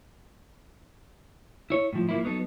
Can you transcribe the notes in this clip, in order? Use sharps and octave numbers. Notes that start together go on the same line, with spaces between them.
E4 C#5
A2 F3
F3 A#3 E4
F#3 B3 D#4 A4